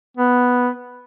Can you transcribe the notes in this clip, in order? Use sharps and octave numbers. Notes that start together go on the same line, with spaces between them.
B3